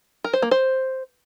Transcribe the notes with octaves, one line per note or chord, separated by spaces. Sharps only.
A#4
C5
A#3
C5